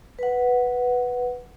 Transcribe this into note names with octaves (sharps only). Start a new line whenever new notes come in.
B4 F#5